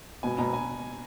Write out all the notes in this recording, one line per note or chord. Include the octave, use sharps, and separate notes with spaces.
B2 G#5
B2 A#5
G#5